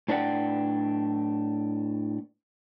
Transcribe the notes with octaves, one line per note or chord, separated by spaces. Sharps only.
A2 D4 B4 D5 F#5 G5